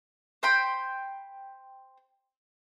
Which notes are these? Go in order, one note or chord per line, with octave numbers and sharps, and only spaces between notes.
C5 G5 B5 C6